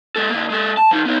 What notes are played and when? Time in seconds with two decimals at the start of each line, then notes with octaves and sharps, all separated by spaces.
0.16 G#3 A4
0.30 D3 A#3
0.50 G#3 A4
0.77 A5
0.91 F3 D#4
1.05 B3 D#4